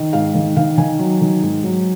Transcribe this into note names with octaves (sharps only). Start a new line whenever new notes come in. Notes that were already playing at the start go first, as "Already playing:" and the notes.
Already playing: D#3
G#2 F5
D#3
D#3 F5
D#3 G#5
F#3
D#3
G#2
F#3